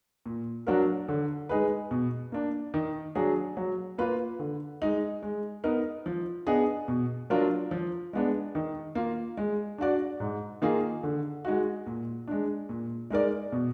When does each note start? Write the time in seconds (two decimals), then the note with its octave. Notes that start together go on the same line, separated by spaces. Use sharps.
0.26 A#2
0.67 F#3 D4 F#4 A#4
1.08 D3
1.49 G#3 D#4 G#4 B4
1.91 B2
2.32 A#3 D4
2.74 D#3
3.15 F#3 D4 G#4
3.57 F#3
3.98 A#3 F4 B4
4.39 D3
4.82 G#3 D#4
5.23 G#3
5.64 B3 D#4 A#4
6.06 F3
6.47 B3 D4 G#4 D#5
6.88 B2
7.30 F#3 D4 F4 A#4
7.71 F3
8.13 G#3 B3 D4
8.55 D#3
8.95 A#3 F4
9.37 G#3
9.78 D4 F#4 D5
10.20 G#2
10.62 D#3 A#3 F4 G#4
11.03 D3
11.45 G#3 D#4 F#4
11.86 A#2
12.28 G#3 D4
12.69 A#2
13.10 G#3 D#4 A#4 D5
13.52 B2